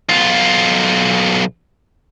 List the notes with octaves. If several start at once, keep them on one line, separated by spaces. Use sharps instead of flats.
B1 F4